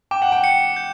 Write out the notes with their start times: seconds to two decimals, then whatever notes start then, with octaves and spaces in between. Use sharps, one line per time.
0.11 G5 D6
0.22 F#5
0.32 G5
0.44 C#7
0.76 G6